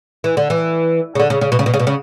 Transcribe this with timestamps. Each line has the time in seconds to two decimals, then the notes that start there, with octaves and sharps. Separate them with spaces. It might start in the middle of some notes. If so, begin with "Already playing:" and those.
0.24 E3
0.37 D3
0.50 E3
1.15 C#3
1.20 D3
1.30 C#3
1.41 C#3
1.52 B2
1.59 C#3
1.66 B2
1.74 C#3
1.79 B2
1.87 C#3